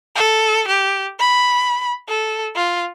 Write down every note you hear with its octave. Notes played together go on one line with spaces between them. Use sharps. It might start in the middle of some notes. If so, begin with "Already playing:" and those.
A4
G4
B5
A4
F4